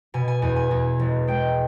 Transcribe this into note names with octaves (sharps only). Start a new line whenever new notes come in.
B2 G#5
G#5
E2 G#5
G#5
E2
E1
G#3 G5